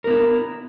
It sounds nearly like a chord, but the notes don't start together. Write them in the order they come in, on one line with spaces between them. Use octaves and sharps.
A#4 B3 E4